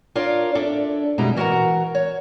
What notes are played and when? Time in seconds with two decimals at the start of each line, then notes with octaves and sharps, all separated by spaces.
0.15 D4 F4 A#4 C#5 D5
0.55 D4 A4 E5
1.18 F#2 B2 G3 G#3 E4 A#5
1.36 E3 F#4 A#4 D5 F#5 A#5
1.95 C#5